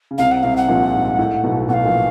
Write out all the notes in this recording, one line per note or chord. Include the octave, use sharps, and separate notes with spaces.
C#3
C2 C3 F5
F#5
C2 C3 F5
F#5
A#1 A#2
G#2
A2
B1 B2
B1 B2 F5 F#5
A#1 A#2